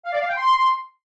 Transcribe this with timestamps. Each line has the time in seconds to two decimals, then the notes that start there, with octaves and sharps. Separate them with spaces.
0.05 F5
0.13 D5
0.21 F5
0.29 G5
0.36 C6